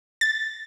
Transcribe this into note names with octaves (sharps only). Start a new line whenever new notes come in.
A6